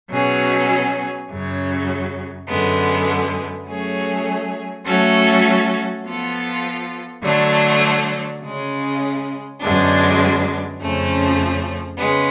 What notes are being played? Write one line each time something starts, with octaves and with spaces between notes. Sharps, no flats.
B2 F#3 C#4 G#4
F#2 C#3 F#3
F#2 D3 G#3 B3
F#3 A3 C#4 G#4
F#3 A3 C#4 F#4 A4
F3 B3 F4 A4
D3 F#3 A3 D4
C#3 G#3 C#4
F#2 D3 G#3 B3 D4
F2 C#3 F3 A3 C#4
C#3 G#3 B3